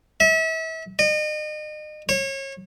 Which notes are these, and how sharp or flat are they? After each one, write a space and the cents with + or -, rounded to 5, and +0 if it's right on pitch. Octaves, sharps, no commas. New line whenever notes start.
E5 -35
D#5 -35
C#5 -30